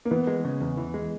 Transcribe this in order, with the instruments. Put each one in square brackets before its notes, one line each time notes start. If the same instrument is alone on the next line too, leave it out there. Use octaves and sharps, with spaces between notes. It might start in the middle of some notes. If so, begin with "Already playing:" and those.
[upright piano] A#3
[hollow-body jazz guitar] E3 [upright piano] B3
[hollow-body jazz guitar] G#3
C#3
E2
E3
G#3